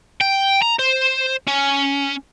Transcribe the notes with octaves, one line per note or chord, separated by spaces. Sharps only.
G5
A#5
C5
C#4